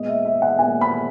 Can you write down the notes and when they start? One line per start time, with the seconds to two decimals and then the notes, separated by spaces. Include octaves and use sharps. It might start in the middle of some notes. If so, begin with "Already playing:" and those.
Already playing: A#2 G#3 B3 D#5
0.09 E5
0.25 E5
0.42 F#5
0.59 A#2 G#3 B3 G#5
0.81 B5